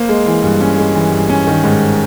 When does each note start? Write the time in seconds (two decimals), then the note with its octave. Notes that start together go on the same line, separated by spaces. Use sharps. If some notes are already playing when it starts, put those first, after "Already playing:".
Already playing: A#3 C5
0.09 G#3
0.26 E3
0.43 G2
0.61 C#4
0.78 G#3
0.95 E3
1.12 G2
1.29 C#4
1.47 D#3
1.64 G#2